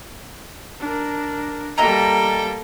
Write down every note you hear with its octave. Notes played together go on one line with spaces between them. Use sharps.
D4 A#4
G3 A#3 A4 D#5 E5 G5 A#5